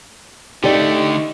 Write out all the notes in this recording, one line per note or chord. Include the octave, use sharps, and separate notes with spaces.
D3 A3 D#4 G4 D5